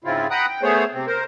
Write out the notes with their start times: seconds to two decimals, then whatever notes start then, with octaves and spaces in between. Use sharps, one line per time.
0.04 G#2 C#3 C4 E4 F4
0.31 F#5 G5 A#5 B5 D#6 F#6
0.48 G5
0.62 A3 B3 G#4 C5 C#5
0.93 C3 C4
1.07 A#4 C5